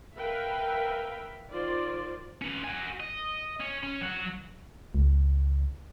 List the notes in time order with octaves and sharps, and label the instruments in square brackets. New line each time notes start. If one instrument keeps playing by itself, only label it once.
[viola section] A#4 B4 E5 F5 G5
D#3 F4 C5 D5
[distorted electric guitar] C#4 B4
F#4 G#5
D#5
C#4
C#4
F#3 F#5
[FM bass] C#2